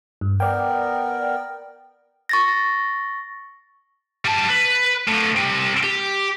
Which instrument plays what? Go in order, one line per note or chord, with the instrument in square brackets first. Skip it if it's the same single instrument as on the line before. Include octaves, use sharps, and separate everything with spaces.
[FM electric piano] G2
[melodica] B3 A#4 [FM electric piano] D5 G5
[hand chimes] C#6 A6 A#6
[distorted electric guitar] G3 A5
B4
A2 D3
G3 C4
G4